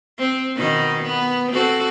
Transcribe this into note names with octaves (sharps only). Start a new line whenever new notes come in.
C4
B2 D#3 D#4
B3
C4 F#4 A4